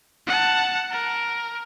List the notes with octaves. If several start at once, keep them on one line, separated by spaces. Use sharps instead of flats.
F#5 A5
A#4